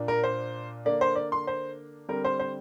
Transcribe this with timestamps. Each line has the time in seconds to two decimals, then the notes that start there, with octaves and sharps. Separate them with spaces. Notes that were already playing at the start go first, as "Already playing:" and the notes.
Already playing: A#2 A#3 D4
0.08 A#4
0.23 C5
0.85 D3 A#3 D4 D5
1.01 C5
1.16 D5
1.32 C6
1.47 C5
2.09 D3 G3 C4 A#4
2.24 C5
2.39 C5